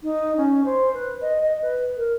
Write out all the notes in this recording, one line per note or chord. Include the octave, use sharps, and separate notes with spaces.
D#4
C#4
C5
B4
D#5
D#5
B4
A#4